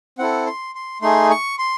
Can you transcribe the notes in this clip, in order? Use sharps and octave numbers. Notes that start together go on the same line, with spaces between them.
C4 E4 A4 F#5
C6
C6
A3 D#4 G#4 C6
C#6
C6